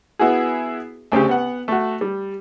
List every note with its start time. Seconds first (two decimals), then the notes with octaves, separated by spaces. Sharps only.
0.19 B3 E4 F#4 G#4
1.12 D2 C#3 C4 G4
1.29 B3 F#5
1.68 A3 F#4
2.01 G3